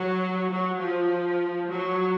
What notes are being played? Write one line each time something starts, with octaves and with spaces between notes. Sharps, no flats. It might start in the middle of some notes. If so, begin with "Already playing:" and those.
Already playing: F#3
F#3
F3
F#3